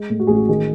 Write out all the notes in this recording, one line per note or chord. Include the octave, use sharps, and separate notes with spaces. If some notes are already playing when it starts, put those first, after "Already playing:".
Already playing: G#3
A2
F#4
A1 G#4
F#4
D#3 G#4